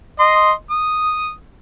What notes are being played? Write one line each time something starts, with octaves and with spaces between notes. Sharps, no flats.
D#5 C6
D#6